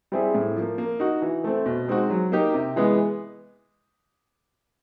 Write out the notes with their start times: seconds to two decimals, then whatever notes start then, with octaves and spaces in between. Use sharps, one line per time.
0.12 G3 C4 E4 G#4
0.35 A2
0.56 F3 A#3
0.78 A#3
1.00 D#4 F#4
1.22 E3
1.44 A3 C4
1.66 B2
1.88 G#3 C4 D#4 F#4
2.10 F#3
2.32 A#3 D#4 G4
2.54 C3
2.76 E3 G#3 B3